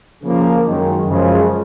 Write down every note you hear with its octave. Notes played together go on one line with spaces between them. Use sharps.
C#3 F3 A#3
F#2 D#3 G#3
F#2 C#3 F3 G#3